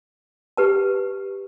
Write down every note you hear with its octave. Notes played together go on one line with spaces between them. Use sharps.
G4 B4 A5